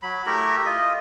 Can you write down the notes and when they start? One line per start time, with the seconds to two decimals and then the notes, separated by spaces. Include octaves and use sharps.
0.03 F#3 B5
0.26 A3 E4 G4 A#4
0.66 F4 D#5